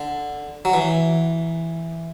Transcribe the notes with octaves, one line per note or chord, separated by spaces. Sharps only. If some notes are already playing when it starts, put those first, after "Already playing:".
Already playing: D3
F#3
E3